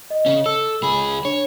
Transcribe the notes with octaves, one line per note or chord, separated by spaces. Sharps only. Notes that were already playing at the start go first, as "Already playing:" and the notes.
D#5
C#3 C#4
A4 E6
C#2 G#4 B5
D4 C#5